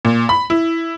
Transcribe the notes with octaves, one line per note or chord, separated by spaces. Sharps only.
A#2
B5
E4